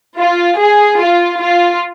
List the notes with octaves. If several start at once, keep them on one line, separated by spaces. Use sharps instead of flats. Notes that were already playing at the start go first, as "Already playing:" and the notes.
F4
G#4
F4
F4